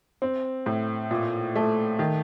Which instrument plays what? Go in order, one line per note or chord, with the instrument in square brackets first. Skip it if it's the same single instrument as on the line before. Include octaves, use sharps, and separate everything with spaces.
[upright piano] C4
A2
A#2
A3
D#3